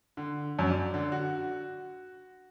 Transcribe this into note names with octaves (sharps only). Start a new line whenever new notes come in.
D3
F#2
D5
D3
F#4